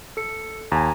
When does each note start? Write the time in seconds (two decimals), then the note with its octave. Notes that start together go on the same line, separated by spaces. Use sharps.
0.17 A4 C#7
0.72 D#2 G#5 A#5